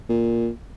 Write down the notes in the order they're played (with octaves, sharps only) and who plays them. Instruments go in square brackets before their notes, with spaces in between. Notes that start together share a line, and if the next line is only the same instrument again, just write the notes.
[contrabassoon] A#2